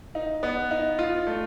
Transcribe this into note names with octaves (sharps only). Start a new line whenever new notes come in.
D#4
B3
D#4
F4
A3